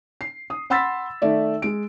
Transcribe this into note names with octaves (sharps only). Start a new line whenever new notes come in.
C7
D#6
F#5 B5 C6 E6 A6 B6
D#3 A3 D5 E5
G#3 D7